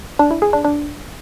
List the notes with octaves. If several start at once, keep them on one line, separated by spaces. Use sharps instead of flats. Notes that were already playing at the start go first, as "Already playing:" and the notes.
D4
E4
G#4
D4
D4